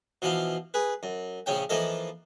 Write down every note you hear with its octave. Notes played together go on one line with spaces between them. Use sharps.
B2 E3 F3 F5
G#4 B4
F#2
A#1 C#3 C#4 G5
E3 F3 A#3 A4 D#5